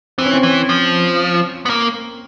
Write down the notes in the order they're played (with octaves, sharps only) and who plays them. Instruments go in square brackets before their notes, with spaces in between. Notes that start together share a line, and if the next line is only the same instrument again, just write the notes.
[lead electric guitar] E3 [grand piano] C4
[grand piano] C#4
C4
[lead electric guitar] E3
F3
B3
A#3